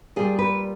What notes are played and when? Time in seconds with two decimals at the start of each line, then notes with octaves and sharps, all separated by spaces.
0.16 A#2 G3 G#4
0.39 B4